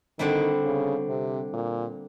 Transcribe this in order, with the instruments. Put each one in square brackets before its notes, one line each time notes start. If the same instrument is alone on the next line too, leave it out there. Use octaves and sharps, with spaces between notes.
[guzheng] D3 G3 C4 E4 [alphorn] D#3
[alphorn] C#3
C3
A#2